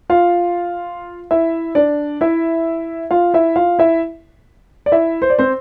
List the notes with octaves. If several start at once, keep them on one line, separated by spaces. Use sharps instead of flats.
F4 F5
E4 E5
D4 D5
E4 E5
F4 F5
E4 E5
F4 F5
E4 E5
D5
E4 E5
C5
D5
C4 C5